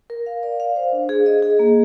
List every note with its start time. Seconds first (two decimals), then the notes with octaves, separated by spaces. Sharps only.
0.10 A#4
0.26 F5
0.43 D5
0.60 F5
0.76 C5
0.93 D4
1.09 G#4
1.26 D#5
1.42 G#4
1.59 A#3